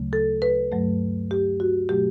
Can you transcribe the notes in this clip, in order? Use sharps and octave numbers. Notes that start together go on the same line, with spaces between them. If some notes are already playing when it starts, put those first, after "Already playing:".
Already playing: D2 C#3 F#3 A3
A4
B4
G2 F#3 A3
G4
F#4
B2 F#3 A3 G4